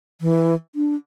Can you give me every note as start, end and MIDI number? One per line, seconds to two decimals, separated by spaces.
0.21 0.54 52
0.75 0.95 62